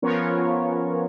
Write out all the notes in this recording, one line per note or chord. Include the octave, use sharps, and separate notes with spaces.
F3 B3 C#4 F4 A#4 C#5